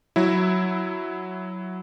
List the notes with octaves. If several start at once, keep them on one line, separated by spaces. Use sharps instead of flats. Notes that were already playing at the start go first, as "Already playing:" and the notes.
F#3 E4